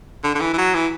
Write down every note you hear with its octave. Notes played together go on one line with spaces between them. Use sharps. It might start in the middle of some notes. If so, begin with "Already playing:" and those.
D3
D3
E3
E3
F#3
E3